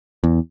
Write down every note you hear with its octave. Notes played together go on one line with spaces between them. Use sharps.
E2